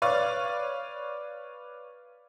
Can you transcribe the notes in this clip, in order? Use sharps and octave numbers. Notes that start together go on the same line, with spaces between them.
B4 C#5 D5 F5 C#6